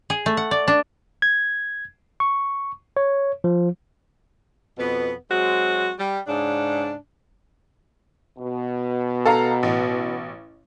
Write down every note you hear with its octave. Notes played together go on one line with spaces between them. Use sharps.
G#4
A3
F#5
D5
D4
G#6
C#6
C#5
F3
F2 B2 B3
F#3 G#3 C4 F#4
G3
G#2 C#3 D4
B2
A4 F5 A#5
A1